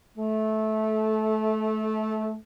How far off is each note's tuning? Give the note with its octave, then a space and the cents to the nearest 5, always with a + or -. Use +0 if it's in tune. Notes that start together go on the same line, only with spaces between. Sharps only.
A3 -20